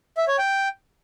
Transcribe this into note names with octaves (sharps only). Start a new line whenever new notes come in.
E5
C#5
G5